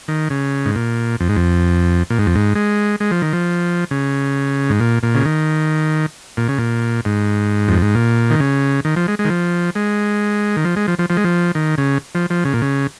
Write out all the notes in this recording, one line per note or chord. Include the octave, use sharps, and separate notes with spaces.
D#3
C#3
G#2
A#2
F2
G#2
F2
A#2
G#2
F2
G#2
G#3
G#3
F3
D#3
F3
C#3
G#2
A#2
A#2
C#3
D#3
A#2
C#3
A#2
G#2
F2
G#2
A#2
D#3
C#3
D#3
F3
G#3
G#3
D#3
F3
G#3
D#3
F3
G#3
F3
F3
F3
G#3
F3
D#3
C#3
F3
F3
C#3
A#2
C#3